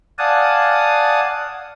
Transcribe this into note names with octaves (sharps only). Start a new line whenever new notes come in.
D5 F5 F#5 G#5 A5 D#6